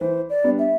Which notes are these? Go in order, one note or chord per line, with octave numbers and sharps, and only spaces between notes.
E3 C5
D5
G3 B3 D4
E5